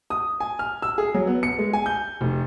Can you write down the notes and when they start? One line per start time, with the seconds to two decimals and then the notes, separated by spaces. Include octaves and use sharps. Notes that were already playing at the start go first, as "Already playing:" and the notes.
0.10 D#6
0.40 G#5
0.59 F6
0.82 E6
0.98 G#4
1.14 F#3
1.27 B3
1.43 C#7
1.59 G#3
1.73 G#5
1.86 G6
2.21 F1